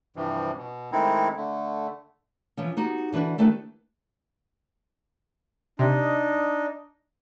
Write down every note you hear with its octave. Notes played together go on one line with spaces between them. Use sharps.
G2 C3 E3 F3
B2
D#3 G#3 A3 C4 D#4 E4
D3 A3
E3 F3 C#4
B3 D#4 F#4 G4
D3 E3 D4 F#4 B4
D#3 A3 D4 E4 G4 B4
C3 D4 D#4 D#5